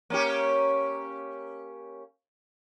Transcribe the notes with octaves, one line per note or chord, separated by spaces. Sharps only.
A#3 C#4 G4